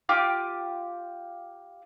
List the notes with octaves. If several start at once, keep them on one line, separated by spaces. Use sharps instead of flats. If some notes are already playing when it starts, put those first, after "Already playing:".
F4 G4 D6